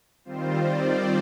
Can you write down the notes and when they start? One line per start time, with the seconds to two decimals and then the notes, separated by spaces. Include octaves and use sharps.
0.25 D#3 G3 C4 F4 C5
0.64 D5